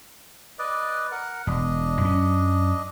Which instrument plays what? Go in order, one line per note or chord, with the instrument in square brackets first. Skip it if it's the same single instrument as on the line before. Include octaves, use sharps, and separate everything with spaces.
[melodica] B4 D5 D#5
A#4 F#5
[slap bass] E1 [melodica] D4 D#5
[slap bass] F#2 C#4